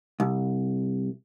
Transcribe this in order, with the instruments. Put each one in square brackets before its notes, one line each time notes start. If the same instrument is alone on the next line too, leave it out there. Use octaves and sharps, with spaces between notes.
[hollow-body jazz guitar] C2